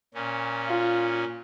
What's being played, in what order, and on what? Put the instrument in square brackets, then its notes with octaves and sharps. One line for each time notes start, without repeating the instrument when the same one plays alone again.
[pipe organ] A#2 C#4
[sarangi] F4